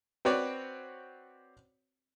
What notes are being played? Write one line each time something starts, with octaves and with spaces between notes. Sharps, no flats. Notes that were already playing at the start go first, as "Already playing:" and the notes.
C4 F#4 B4 C#5 D5